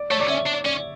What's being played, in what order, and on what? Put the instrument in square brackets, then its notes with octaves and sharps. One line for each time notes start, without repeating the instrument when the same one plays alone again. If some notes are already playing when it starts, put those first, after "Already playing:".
Already playing: [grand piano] D5
[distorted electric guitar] A3 [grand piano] C#5
[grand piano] D5
[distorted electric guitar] C#4 [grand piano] E5
[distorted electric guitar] D4
[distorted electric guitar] C#4 [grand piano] D5